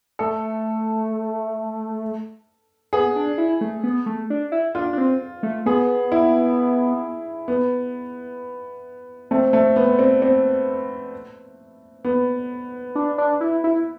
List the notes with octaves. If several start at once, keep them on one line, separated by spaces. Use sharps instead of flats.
A3 A4
B3 G#4
D4
E4
A3
B3
A3
D4
E4
D4 F4
D4
C4
A3
B3 G#4
E4
B3
A3 C4
A3
B3
C4
C4
B3
D4
D4
E4
E4